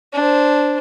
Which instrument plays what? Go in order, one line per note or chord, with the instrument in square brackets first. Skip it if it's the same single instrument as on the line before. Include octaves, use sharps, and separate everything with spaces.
[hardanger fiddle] D4 C5